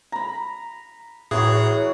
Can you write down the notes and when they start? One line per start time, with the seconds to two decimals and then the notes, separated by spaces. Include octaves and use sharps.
0.12 A#5 B5
1.31 A2 E3 F#3 G#4 C#6 D#6